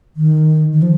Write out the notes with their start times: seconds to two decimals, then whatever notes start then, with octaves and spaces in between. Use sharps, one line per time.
0.16 D#3
0.73 D#3
0.82 F3